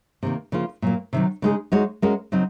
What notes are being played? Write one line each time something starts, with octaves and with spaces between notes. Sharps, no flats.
C3 D#3 A#3
C#3 F3 A#3 F4
A#2 F#3 A#3
C3 D#3 F#3
C#3 G#3 D#4 G#4
G#3 D#4 F#4 C#5
G#3 C#4 F#4 A#4
C#3 F#3 C4 D#4